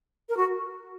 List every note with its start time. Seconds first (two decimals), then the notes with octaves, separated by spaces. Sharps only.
0.29 A#4
0.37 F#4